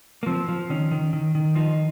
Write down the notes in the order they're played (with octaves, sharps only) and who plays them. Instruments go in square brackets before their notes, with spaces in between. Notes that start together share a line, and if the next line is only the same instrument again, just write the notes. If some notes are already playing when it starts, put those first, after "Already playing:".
[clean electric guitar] A#3
F3 C4
F3
D#3 C#4
D#3
D#3
D#3
F3 D#4